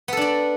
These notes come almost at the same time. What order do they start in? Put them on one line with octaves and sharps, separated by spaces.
B3 A4 D4 D5